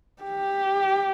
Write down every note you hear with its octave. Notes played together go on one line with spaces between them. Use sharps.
G4